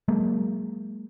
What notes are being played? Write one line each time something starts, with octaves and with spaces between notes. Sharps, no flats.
F#3 G#3 A#3